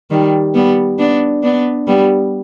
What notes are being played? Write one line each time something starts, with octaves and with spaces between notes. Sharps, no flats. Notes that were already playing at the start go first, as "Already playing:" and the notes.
D#3 G3
G3 B3
B3 D4
B3 D4
G3 B3